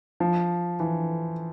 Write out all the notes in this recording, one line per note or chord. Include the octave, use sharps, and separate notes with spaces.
F3
E3